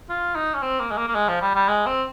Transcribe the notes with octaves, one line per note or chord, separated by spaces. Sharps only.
F4
D#4
C#4
C4
A#3
G#3
A#3
A#3
G#3
F3
G3
G3
G#3
C4